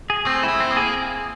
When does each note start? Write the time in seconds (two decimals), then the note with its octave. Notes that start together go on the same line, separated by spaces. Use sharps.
0.10 G#4
0.26 A3 C4
0.43 A3 E4
0.60 C4
0.71 A#3
0.77 G#4